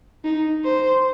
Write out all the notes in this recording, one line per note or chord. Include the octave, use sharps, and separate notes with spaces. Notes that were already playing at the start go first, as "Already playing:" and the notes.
D#4
C5